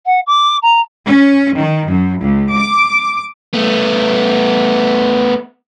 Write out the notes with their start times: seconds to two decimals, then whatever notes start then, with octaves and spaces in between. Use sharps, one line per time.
0.05 F#5
0.26 D6
0.62 A#5
1.07 C#4
1.57 D#3
1.90 F#2
2.22 C#2
2.55 D6
3.54 A3 B3